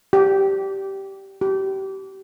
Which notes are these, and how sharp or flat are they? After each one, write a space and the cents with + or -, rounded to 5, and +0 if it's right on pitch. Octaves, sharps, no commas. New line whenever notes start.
G4 -10
G4 -30